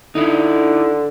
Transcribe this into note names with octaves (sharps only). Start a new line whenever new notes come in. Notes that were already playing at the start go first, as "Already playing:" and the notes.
D3 D#4 E4